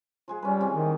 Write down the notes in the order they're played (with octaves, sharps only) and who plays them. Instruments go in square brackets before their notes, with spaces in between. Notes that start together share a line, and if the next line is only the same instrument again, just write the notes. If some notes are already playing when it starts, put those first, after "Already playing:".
[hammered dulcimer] F3 G#3 G#4
[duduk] G3 [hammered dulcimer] C#4 B4
[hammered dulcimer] C3 E3 C4
[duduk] D#3